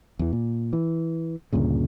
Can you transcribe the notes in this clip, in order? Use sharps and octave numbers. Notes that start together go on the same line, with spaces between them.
E2 E3
A#2
E3
D2 G2 A#2 C#3